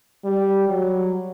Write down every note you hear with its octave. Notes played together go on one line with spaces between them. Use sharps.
G3
F#3